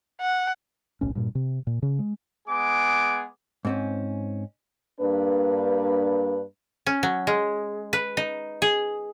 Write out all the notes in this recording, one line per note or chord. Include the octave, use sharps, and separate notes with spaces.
F#5
D1 B1 A2 C#4
G2 A#2
C3
A#2
C#3
G#3
G#3 B3 G#4 D6
G#2 C4 C#4
G2 A#3 D4 B4
C#4
F#3
G#3
B4
D#4
G#4